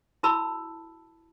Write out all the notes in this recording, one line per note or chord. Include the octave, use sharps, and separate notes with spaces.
E4 F#4 A#4 A5 B5 E6